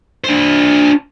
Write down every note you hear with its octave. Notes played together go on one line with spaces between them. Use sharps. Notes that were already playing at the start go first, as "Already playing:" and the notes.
D4 C5